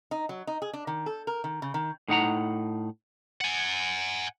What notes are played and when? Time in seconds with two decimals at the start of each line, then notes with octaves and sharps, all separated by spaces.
0.11 D#4
0.29 F#3
0.47 D#4
0.62 G#4
0.73 D4
0.87 D#3
1.06 A4
1.27 A#4
1.44 D#3
1.62 C#3
1.74 D#3
2.08 A2 D#4 F#5 A#5
3.41 F#5 G#5